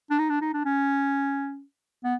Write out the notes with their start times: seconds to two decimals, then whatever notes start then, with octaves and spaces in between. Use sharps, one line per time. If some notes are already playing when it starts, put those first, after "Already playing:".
0.10 D4
0.19 D#4
0.30 D4
0.41 D#4
0.53 D4
0.65 C#4
2.04 B3